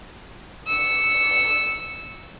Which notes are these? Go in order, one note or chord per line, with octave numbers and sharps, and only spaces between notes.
E6 C#7